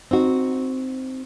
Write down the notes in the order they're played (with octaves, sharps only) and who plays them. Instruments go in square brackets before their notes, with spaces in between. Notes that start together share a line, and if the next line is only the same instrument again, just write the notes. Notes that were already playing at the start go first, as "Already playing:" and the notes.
[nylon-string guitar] C4 D#4 F#4